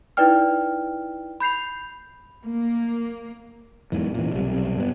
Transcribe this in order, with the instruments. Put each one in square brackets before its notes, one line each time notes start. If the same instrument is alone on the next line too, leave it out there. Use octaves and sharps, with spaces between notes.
[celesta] D#4 E4 B4 D5 G5 F6
B5 G6 C7 F7
[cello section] A#3
[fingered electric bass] E2 G#2 E3
A#2 E3
B1 C3 G3
G2 B3